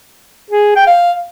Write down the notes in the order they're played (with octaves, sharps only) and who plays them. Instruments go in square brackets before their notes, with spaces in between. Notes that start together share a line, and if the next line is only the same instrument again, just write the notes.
[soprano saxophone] G#4
G5
F5